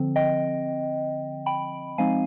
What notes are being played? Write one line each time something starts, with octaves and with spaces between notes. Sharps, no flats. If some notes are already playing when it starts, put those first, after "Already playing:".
Already playing: D3 F3 C4
D#5 G5
G5 B5
F3 G#3 C4 D#4 F5 G#5